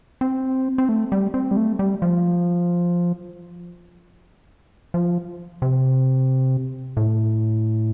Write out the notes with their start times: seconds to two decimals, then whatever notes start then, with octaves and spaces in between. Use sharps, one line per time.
0.21 C4
0.78 C4
0.89 A3
1.12 G3
1.34 C4
1.51 G3
1.57 A3
1.79 G3
2.02 F3
4.94 F3
5.62 C3
6.97 A2